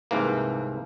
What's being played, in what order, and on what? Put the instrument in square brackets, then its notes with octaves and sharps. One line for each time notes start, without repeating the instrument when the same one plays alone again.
[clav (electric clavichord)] C2 G#2 E3 A#3